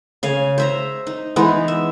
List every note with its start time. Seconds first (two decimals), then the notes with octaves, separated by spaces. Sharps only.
0.23 C#3 F5 G#5
0.58 C5 E5 A#5
1.07 D#4
1.36 E3 G#3 B3 D#4
1.68 E5